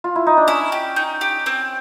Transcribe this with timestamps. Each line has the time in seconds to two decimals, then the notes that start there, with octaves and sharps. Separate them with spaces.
0.04 F4
0.16 E4
0.27 D#4
0.37 D4
0.47 C#4 E4
0.72 G4
0.96 D#4
1.21 G4
1.46 C4